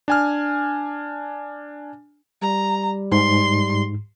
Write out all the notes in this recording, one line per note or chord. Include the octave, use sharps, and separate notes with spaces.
D4 G#5 F6
G3 A#5
G#2 C6